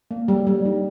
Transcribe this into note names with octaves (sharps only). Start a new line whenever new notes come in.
A#3
G3
G3
D#4